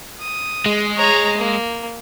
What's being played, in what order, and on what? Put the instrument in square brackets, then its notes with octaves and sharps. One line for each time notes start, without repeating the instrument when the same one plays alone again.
[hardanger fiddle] D#6
[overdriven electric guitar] G#3
[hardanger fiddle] C#5 A#5
A#3